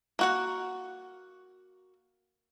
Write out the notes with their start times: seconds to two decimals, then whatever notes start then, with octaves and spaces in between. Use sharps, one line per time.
0.19 A#3 F#4 F#5